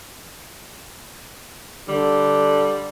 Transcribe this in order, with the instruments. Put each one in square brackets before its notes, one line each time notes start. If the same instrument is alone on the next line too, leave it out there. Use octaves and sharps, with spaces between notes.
[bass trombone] D3 [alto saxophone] G3